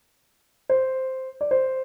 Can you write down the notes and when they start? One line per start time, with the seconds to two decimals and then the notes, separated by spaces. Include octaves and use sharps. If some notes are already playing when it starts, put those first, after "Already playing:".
0.70 C5
1.41 D5
1.51 C5